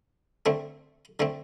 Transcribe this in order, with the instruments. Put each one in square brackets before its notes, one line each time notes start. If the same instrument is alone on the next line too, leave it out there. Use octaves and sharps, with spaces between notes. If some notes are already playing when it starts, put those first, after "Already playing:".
[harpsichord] D3 A3 C4
D3 A3 C4